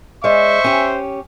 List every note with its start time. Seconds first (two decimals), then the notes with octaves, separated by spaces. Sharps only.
0.24 G#3 C5 D5 E5 C#6
0.64 C#4 G4